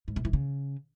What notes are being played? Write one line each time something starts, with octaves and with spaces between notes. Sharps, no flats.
G#2
C3
E3
C#3